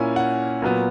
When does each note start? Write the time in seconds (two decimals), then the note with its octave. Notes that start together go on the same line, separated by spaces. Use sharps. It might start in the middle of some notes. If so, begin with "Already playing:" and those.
Already playing: A#2 A#3 C#4 E4 G#5
0.16 F#5
0.62 A#2 F#3 B3